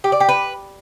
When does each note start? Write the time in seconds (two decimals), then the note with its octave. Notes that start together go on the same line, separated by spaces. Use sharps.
0.04 G4
0.12 D5
0.20 G4
0.29 B4